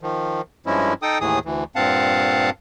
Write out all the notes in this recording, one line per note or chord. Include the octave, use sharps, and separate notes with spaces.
D#3 F3
G2 F3 G#3 C#4 E4
D#4 A4 G5 D#6
D#2 A2 E3 G#4 D#6
D2 E3
G2 A#2 C4 F5 F#5 A5